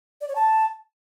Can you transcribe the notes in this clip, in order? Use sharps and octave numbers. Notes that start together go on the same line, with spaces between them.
D5
C#5
A5